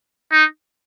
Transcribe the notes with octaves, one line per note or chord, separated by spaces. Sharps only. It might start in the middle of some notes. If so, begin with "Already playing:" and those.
D#4